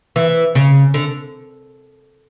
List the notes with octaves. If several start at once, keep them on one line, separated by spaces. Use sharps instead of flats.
E3
C#3
D3